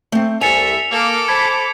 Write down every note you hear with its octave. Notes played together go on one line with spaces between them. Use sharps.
A3 C4
C2 A4 E5 G#5 C#7 F7
A#3 A4 D6
C5 A5 B5 G#6